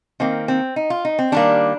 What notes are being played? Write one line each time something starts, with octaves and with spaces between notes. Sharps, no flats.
D#3 A#3 C4
C4
D#4
F4
D#4
C4
D#3 G3 A#3 D4